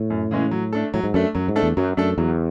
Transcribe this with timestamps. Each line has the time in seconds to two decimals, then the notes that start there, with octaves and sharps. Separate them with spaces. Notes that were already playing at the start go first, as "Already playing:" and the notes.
Already playing: A2
0.10 F#2
0.31 C#3 E3 G#3 C#4
0.51 F#3
0.73 A3 D4 A4
0.94 A2 F#3
1.04 G#2
1.14 F#2 A3 D4 A4
1.35 F#2 F#3
1.48 G#2
1.56 A3 D4 A4
1.63 E2
1.77 F#2 F#3
1.97 F#2 A3 D4 A4
2.18 E2 F#3